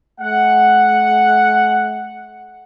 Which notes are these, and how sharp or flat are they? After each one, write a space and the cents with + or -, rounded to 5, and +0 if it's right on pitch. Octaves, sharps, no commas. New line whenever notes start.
A3 -45 F#5 +0